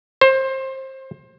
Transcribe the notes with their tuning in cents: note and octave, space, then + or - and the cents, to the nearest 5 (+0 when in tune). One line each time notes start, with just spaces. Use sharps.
C5 +25